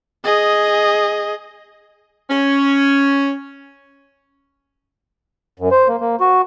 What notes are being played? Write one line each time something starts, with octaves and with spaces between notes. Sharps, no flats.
G#4 D#5
C#4
F#2
C5
A#3
A#3
F#4